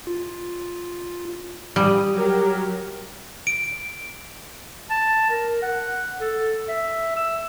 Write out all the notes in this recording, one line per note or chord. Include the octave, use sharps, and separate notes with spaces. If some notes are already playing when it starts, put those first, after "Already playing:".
F4
G3 D#6
F#3 G4 A#4
D7
A5
A#4
F#5
A4
E5
E6